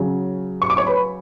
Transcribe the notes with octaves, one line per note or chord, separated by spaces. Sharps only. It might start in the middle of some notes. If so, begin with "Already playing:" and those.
Already playing: C#3 F#3
C#6
D6
C#5 C#6
B4 B5